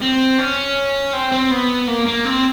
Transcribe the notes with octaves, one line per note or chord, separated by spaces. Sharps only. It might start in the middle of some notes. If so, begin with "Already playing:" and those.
C4
C#4
C4
C4
B3
A#3
A#3
C4